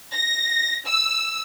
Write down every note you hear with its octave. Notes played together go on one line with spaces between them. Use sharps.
A#6
E6